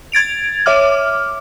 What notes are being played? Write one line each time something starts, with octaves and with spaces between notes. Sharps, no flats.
G#6 A6 D7 F7
C#5 E5 D6 F6